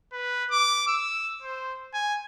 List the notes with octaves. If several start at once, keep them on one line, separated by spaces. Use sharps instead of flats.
B4
D6
E6
C5
G#5